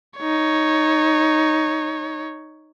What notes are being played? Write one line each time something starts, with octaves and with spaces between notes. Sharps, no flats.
D#4 C#5